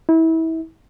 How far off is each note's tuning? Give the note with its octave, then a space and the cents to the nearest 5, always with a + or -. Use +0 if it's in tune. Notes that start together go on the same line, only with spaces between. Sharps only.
E4 -30